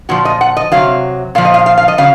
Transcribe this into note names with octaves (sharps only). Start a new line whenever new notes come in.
A#2 F3 F#4
D#5
F#5
D#5
C3 F#3 F5
A#2 F3 F5
D#5
F5
F5
F5
D#5
C#3 F#3 F5